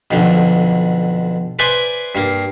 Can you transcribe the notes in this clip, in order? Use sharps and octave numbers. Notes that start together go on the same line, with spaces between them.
B1 F2 D3
B4 C5 D5 E5 G#5 C6
G2 A#3